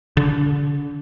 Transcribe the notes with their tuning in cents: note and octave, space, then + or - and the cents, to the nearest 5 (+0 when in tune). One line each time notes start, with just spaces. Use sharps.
D3 -35